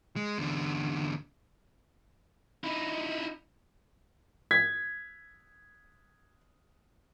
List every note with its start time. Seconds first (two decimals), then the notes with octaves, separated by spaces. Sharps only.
0.16 G#3
0.38 E2 D3
2.64 D#4 E4
4.51 G#6 B6